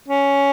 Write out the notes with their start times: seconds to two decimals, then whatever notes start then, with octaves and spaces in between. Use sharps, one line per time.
0.08 C#4